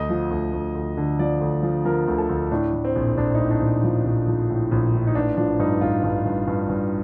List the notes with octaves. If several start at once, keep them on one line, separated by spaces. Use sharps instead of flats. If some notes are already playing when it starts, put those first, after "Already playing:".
Already playing: D2 D#5
F3
D2
D2
D2
D3
F3 D5
D2
F3
F3 A#4
D2
A4
D2
A2 D4
A2
C4
A#1
A#1 D4
D#4
A2
D4
A#1
F3
A#1
F3
A2
A#1
A2
D#4
A1 D4
F3 D4
G2 D#4
A1 F4
G2
G2
G2
G2